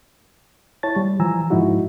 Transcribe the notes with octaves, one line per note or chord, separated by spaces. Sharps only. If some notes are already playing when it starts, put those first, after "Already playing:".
E4 C#5 A5 A6
G3
E3 F3 G#5 A#5 E6
G#2 F3 D#4 E4 F#4